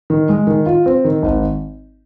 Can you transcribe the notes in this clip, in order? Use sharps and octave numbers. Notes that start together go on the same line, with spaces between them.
D#3
G#3
D#3
F4
C4
D#3
G#1